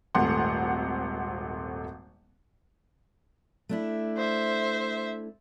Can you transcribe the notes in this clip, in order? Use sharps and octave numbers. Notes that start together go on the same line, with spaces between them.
D#1 G#1 A3 F#5 C6
A3 D4 E4
C5 E5